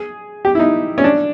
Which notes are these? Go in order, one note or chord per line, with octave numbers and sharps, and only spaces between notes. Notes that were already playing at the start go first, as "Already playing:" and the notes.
Already playing: G#4
G4
E4
D#4
C#4
D4